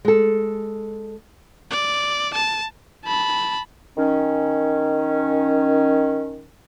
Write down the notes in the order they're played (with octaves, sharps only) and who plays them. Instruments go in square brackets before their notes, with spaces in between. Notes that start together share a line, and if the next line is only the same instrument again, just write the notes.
[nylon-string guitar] G#3 A4
[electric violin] D5
A5
A5 B5
[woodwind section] D#3 C#4